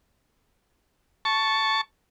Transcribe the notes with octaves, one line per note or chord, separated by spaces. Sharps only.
A5 C#6